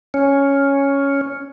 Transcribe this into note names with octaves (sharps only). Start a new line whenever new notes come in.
C#4